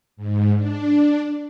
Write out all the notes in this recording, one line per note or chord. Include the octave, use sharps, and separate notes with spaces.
G#2
D4